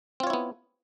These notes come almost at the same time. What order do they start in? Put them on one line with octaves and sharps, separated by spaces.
C4 F4 C#5 E4 B3